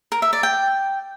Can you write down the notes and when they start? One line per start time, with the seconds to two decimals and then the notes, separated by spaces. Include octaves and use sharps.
0.12 A#4
0.22 E5
0.33 D5
0.43 G5